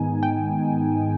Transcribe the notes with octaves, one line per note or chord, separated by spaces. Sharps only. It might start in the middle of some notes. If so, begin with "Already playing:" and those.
Already playing: G#2 D#3 G#3 B3 D#4 G#5
G5